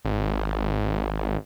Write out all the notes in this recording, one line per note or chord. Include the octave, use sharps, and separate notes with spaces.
G#1